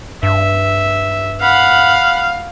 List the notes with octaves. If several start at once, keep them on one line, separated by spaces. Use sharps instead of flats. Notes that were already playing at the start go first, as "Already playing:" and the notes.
G2 E5
F5 F#5 B5